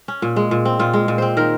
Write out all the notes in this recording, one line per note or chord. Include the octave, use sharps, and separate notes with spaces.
C#4
A#2
G#3
A#2
C4
A#2 F4
G#3
A#2
C4 C5
D#3 A#4